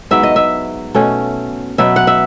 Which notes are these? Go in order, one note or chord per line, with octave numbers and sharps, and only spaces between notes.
G#2 F#3 B3 E5
D#5
E5
B2 A3 C#4
B2 F#3 B3 E5
F#5
E5